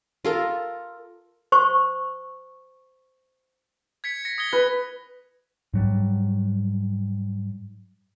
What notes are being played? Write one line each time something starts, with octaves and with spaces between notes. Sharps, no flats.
F4 A4 A#4
C5 C#6
G#6 B6 C#7
A#6 C#7
D#6 G#6 G7
B4
G#2 F#3 G3